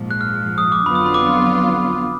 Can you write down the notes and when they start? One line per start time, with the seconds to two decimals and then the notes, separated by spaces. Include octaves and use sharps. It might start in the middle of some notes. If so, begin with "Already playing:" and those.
Already playing: A#1 G#2 F3
0.11 F#6
0.21 F6
0.58 D#6
0.72 D6
0.86 F2 D3 F#3 B3 F4 B5
0.95 D#6
1.06 B5
1.14 D6